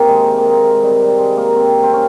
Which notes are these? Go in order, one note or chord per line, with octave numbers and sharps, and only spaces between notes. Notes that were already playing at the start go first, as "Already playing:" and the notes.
Already playing: C3 D#3 A#3 C4
G#3
A#3
G#3
G#3
C3 D#3 G3
G3
G#3
A#3
C4
C4
C#4